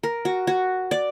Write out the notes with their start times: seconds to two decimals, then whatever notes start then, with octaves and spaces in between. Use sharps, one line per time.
0.03 A#4
0.25 F#4
0.47 F#4
0.91 D5